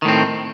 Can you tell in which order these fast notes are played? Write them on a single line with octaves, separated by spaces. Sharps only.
D#3 A2 C4